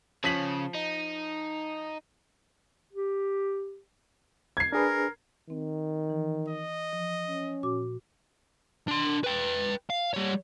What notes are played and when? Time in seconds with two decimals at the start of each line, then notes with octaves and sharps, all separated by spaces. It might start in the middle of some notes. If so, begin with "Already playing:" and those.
0.24 C#3 F3 B6 F#7
0.75 D#4
2.93 G4
4.57 G#6 C7
4.72 D4 G#4 A#4 B4
5.50 D#3 C4
6.10 E3
6.48 D#5
6.93 F3
7.27 C#4
7.63 A#2 F#4 D6
8.88 D4 C6
9.24 B4 G5
9.90 F5
10.14 G3 C#5